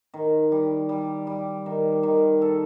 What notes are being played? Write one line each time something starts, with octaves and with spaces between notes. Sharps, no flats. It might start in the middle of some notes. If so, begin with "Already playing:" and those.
D#3
G3
G3
G3
D#3
D#3
A4